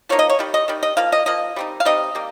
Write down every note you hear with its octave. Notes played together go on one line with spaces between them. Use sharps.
F3 A#3 D#4 C#5
D#5
C#5
D#3 G3
D#5
D#3 G3
D#5
F3 A#3 F5
D#5
F3 A#3 D#5
G3 C4 D#4
F5
G3 C4 D#4 D#5
G3 A#3